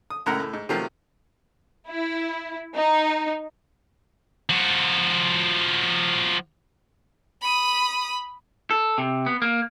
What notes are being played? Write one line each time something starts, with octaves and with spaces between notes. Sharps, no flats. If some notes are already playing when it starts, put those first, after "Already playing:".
D#6
C#2 F#2 A2 A#4 F#5 A#5
A2
G#2
C3 D#3 F3 F#3 A3
E4
D#4
F3 F#4
B5 D#6
A4
C3
B3
A#3